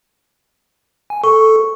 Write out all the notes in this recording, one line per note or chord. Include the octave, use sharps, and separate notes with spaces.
G#5
A4 C#6